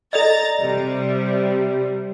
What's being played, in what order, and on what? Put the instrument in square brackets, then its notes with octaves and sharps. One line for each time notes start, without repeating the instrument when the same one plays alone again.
[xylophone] A4 D5 D#5 [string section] A#5 A6
[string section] C3 G3